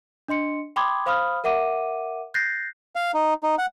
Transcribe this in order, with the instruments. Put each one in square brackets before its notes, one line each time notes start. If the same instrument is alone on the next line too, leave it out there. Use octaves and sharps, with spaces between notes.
[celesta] D4 D#5 C6 C#7
G5 B5 C6 D6 D#6 G#6
C5 F5 B5 D#6 F6
A#4 E5 F#5 D6 D#7
F#6 G6 A6 A#6 C7
[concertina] F5
D#4
D#4
F#5